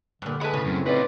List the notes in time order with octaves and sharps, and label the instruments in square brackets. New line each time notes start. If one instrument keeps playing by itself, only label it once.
[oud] G2 A#2 [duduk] D3
[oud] G#3 A3 [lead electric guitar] B4 B5
[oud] A2 C#3
[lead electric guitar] F#2 [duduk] C4
[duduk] C4 [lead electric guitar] D#4 F4 [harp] B4 D5